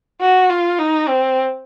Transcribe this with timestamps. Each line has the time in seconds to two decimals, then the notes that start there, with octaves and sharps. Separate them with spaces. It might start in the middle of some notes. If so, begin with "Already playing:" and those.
0.21 F#4
0.50 F4
0.78 D#4
1.08 C4